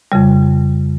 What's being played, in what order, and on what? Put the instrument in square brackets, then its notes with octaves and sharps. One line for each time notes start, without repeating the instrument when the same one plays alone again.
[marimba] F2 C#3 G3